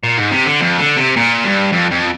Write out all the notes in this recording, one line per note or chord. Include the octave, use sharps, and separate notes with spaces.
A#2
G#2
C3
D3
F2
D3
C3
A#2
G2
F2
F2